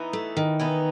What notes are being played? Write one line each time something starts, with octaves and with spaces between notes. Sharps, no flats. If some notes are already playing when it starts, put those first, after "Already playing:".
Already playing: E3 B3 D#4
A3
D#3
E3 B3 D#4